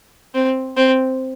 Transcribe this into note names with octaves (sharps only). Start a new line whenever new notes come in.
C4
C4